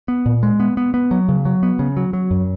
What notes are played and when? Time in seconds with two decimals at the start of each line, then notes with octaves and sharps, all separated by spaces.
0.08 B3
0.26 A#2
0.43 G#3
0.60 B3
0.77 B3
0.94 B3
1.11 F#3
1.29 C#3
1.45 F#3
1.63 B3
1.79 C#3
1.97 F#3
2.13 F#3
2.31 F#2